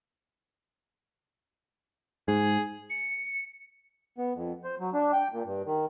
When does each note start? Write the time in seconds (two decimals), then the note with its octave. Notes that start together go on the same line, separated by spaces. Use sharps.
2.28 G#2 G#4
2.90 C#7
4.18 B3
4.35 F2
4.64 C5
4.80 F#3
4.94 D4
5.13 G5
5.32 A#2
5.45 G2
5.66 D#3